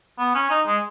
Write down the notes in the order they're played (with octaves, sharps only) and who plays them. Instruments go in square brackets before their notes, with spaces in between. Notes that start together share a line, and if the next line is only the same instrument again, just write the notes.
[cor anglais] B3
C#4
D#4
G#3